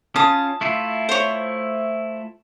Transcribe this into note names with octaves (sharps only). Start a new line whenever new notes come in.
C#4 F4 A5 D#6
A3 E4 F4
C5 C#5